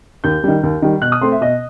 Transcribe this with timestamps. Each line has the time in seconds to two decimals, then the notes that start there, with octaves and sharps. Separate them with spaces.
0.24 D#2 G6
0.44 D#3 G3
0.63 D#2
0.82 D#3 G3
1.02 B2 F#6
1.12 D#6
1.21 A3 C4 C6
1.32 E5
1.41 B2 D#5